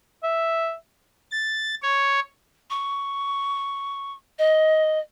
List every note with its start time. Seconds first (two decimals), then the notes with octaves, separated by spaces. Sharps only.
0.23 E5
1.31 A6
1.83 C#5
2.70 C#6
4.38 D#5